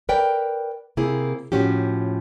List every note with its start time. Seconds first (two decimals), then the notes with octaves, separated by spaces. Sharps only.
0.09 A#4 B4 D5 G5
0.97 C3 A#3 E4 G#4
1.52 A2 F3 C#4 F#4 G4